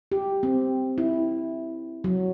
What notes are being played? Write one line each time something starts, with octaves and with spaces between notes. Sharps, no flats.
G4
C4
E4
F#3